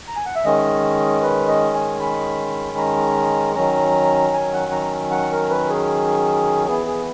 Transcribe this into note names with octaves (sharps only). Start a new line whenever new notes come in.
A#5
G#5
F#5
E5
D#3 G#3 C#4 D#5
B4
D#5
G#5
B5
A#5
D#3 F#3 C#4 A#5
G#5
F#5
A#5
F#5
A#4
B4
G#4
E3 B3 G#4
G#4